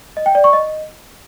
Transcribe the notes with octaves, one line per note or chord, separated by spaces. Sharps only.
D#5
G5
D5
C#6
D#5